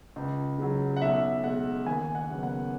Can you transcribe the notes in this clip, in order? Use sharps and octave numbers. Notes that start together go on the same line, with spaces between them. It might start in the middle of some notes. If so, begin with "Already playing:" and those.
C#2
C#3 F#3
F#5
B1 E5
B2 G#3 F#5
D#2 G#5
F#5
C#3 F#3 B3
F#5